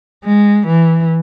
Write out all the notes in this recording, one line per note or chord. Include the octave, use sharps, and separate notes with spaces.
G#3
E3